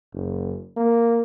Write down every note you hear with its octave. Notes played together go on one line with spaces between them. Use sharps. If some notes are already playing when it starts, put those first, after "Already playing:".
F#1
A#3